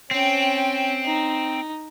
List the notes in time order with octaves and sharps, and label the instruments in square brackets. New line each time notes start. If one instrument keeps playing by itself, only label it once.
[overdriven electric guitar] C4 [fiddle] C#4 G5
[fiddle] D#4